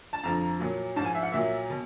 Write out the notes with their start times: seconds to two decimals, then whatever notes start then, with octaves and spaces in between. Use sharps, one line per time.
0.13 A5
0.23 F2 D3 F3 A#5
0.59 A#2 F#3
0.96 G#2 A5
1.00 F3 G#5
1.15 E5
1.23 F#5
1.32 A#2 F#3 E5
1.70 B2